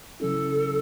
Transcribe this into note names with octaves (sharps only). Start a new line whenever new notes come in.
C#3 F#3 C#4 E4 A4